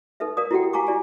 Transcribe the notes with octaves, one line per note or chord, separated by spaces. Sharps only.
D#4 A4 B4 E5
A#4 D5 F5 D#6
E4 F#4 G4 A4 F#5 G5
G4 F5 G#5 A#5 C#6 D6
E4 D5 G#5